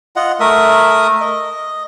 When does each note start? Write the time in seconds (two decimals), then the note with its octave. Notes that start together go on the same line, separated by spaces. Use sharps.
0.16 F4 D#5 F#5
0.40 A3 A#4 E5 D#6
1.21 D#5